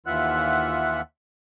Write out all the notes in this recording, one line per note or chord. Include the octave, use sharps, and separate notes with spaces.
D#2 E3 F4 E5 F#5 F#6